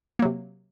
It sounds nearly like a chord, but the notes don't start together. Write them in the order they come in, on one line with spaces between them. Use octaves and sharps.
A#3 F#3 C3